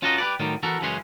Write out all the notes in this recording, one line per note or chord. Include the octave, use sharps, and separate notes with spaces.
C#4 F4 F#4 A4 A#4 D#5
G4 B4 D5
A2 D#3 F#3 G3 F4
E3 B3 F#4 A4 A#4
F#2 C#3 E3 G#3 C#4 C6